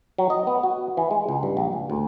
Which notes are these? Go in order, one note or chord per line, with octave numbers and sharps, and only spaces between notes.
F#3
D#5
B3
F#4
E3
G#3
C#2
G2
A#1
C#2
D2